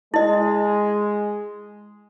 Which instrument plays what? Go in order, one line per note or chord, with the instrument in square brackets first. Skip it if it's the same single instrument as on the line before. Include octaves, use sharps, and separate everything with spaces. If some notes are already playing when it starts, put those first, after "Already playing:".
[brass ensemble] G#3 [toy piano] E4 D#5